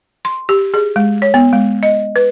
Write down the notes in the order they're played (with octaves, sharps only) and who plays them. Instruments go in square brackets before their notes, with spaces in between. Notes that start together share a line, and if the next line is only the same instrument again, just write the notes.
[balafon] C6
G4
G#4
G#3
C#5
B3
G#3
D#5
B4